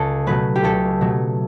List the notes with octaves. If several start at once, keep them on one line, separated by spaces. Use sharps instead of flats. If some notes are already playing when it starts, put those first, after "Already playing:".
Already playing: C#2 A4
B2 F#3 A3 B4
G4
C#2 A4
B2 F#3 A3